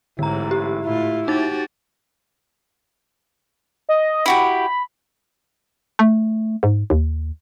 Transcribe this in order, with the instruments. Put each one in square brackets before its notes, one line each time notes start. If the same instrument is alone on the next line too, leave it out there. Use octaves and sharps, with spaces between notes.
[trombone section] A1 E4 [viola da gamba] G#2 [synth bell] D3 A#5
[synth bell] G4
[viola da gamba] A2 F4 [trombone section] E4
[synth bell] D#4 A6 [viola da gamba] F#4 G4
[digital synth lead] D#5
[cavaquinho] E4 F#4 G4 [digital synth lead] B5
[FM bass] A3
G#2
D#2